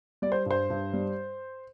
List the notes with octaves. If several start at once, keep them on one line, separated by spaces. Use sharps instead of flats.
G3 D5
C5
G2 C5
G2
G3